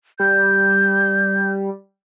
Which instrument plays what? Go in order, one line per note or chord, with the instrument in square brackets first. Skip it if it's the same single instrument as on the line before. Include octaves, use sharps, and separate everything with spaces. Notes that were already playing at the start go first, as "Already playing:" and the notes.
[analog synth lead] G3 [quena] G6